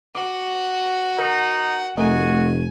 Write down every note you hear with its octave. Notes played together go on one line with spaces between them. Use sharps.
F#4 F#5 D6
D#4 A#4
F1 A3 F#4 A#4 D#5 G#5